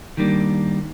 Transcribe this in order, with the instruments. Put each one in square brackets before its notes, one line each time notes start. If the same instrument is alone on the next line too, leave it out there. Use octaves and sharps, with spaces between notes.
[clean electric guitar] D#3 G3 A#3 D4